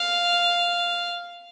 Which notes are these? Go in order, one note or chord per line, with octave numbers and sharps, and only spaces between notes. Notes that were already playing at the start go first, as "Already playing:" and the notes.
Already playing: F5